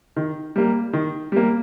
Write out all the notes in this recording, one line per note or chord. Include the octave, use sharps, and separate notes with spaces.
D#3
G3 A#3
D#3
G3 A#3